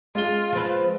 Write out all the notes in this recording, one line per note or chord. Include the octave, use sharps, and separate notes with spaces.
G#3 F4 G7
F3 C4 B4